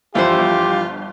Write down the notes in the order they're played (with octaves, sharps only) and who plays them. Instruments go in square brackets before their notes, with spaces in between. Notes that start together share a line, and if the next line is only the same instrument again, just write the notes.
[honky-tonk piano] G1 [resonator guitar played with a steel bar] E3 F3 C5 [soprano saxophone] F4 [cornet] G4